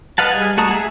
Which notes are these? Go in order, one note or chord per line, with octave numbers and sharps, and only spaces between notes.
B4 D#5 F5 F#5 A5
G3 G#4 D#5 G#5
A3 F#4 A5 A#5 D#6
G#4 E5